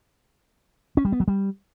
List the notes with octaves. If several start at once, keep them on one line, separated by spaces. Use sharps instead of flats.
C#4
G3
B3
F#3
G3